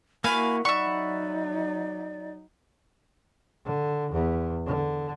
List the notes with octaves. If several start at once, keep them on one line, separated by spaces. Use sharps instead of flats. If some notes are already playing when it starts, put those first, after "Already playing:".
A#3 E4 F#4 F5 G#5 B5
F#3 D#4 D5 E5 F#5 B5 C#6
D3
E2
D3